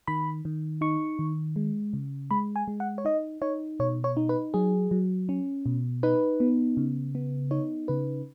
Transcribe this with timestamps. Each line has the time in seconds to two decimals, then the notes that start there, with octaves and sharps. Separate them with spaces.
0.07 D#3 B5
0.45 D#3
0.81 D#4 C#6
1.19 D#3
1.56 G#3
1.93 C#3
2.31 G#3 B5
2.56 G#5
2.68 G#3
2.80 F#5
2.98 C#5
3.05 D#4 D#5
3.42 D#4 C#5
3.80 B2 C#5
4.04 C#5
4.17 D#4
4.29 B4
4.54 F#3 G#4
4.91 F#3
5.29 C#4
5.66 B2
6.03 D#4 B4
6.40 B3
6.77 C#3
7.15 B3
7.51 D#4 C#5
7.88 C#3 B4